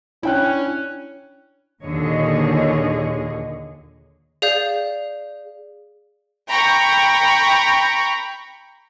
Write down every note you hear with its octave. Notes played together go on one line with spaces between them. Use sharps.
C#4 D4 E4 G5 F#6
D#2 A#2 D3 G#4 C#5 D#5
G#4 D5 F5 G6
G5 A#5 B5 C#6